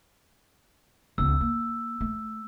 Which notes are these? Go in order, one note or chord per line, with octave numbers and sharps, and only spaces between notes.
C#2 B3 E6
A#3
A3